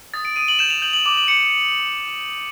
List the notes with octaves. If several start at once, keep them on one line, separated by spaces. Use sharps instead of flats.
D#6 A6
D7
D#6 D#7
F#7
G6 E7
F7
G6 F#7
F#7
D6 F#7
F#7
D6 C#7